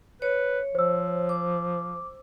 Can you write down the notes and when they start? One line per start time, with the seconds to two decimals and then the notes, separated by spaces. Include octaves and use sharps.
0.22 B4 C#5
0.75 F3 C5 E6
1.29 D6